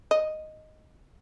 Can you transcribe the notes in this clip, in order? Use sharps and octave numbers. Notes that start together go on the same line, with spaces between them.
D#5